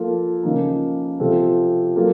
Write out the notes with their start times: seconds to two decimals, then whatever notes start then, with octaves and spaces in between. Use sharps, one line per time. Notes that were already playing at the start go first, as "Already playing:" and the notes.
Already playing: F3 A#3 F4 A4
0.43 C#3 F3 A#3 D#4
1.19 C3 F3 C4 F4 A4
1.96 F#3 A#3 F4 A4